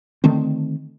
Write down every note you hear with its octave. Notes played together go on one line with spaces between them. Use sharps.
D3 D#3 A3 C4